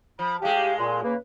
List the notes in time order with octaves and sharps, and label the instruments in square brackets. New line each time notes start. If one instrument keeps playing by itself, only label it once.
[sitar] F3 [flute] B5
[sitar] A2 G#3 [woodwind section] G4 [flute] F5
[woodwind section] A#2 [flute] C6
[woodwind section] C#3 A#3 [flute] B4